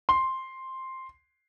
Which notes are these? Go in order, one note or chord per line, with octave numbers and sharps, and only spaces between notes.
C6